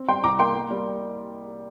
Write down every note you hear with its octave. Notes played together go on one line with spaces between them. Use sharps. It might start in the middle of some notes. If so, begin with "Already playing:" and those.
Already playing: C4
G3 G5 C6
C2 A#5 D6
A#3 G5 C6
A#3
G3